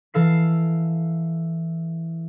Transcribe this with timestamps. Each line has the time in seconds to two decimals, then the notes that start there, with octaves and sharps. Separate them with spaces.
0.14 E3 A4 F5 C7